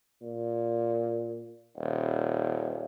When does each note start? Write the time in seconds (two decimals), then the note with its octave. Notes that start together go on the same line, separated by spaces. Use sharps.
0.22 A#2
1.77 D#1